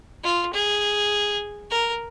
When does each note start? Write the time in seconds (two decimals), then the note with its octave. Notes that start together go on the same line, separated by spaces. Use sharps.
0.24 F4
0.53 G#4
1.71 A#4